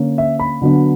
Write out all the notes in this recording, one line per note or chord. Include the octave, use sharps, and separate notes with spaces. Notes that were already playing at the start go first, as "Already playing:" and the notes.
Already playing: D3 A#3 C#4
E5
B5
D3 F#3 B3 D4